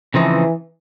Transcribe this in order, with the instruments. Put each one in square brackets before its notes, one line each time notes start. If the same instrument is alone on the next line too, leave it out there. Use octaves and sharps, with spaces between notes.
[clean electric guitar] C#3 F3 A3 C4 D#4 [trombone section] E3